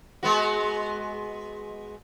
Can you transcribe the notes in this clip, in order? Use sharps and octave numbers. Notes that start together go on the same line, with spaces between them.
G#3 B3 F#4